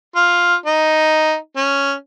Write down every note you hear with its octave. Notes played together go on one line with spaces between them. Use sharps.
F4
D#4
C#4